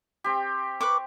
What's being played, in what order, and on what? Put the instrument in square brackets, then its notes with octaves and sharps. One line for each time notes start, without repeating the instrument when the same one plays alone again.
[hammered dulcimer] C4 G4
[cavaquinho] B4 C#6 D6